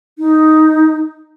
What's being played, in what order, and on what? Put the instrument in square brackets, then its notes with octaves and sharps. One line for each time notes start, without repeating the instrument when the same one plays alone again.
[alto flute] D#4